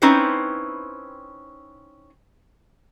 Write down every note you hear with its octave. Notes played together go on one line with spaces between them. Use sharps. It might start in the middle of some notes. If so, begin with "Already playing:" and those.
C4 C#4 D#4 E4 B4 C5